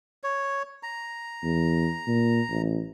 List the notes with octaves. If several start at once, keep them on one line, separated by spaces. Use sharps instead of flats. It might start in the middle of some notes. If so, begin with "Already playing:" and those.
C#5
A#5
E2
A#2
A1